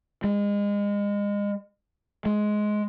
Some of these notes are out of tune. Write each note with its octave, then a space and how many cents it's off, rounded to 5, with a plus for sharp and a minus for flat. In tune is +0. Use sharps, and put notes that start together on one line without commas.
G#3 -30
G#3 +15